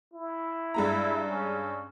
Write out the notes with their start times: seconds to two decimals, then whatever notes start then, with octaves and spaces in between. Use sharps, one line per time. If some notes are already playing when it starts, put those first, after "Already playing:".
0.13 E4
0.74 G2 G#3 A#5
1.29 C#4